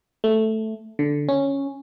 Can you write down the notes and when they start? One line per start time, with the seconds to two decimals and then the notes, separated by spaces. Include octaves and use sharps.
0.24 A3
0.99 D3
1.29 C#4